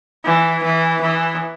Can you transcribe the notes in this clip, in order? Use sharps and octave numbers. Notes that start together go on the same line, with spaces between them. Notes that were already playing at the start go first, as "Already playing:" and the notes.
E3
E3
E3